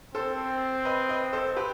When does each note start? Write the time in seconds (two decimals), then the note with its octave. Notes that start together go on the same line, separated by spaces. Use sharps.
0.14 C4 A4 C5
0.85 B4 D#5
1.09 B4 D#5
1.33 A4 C5
1.56 G4 B4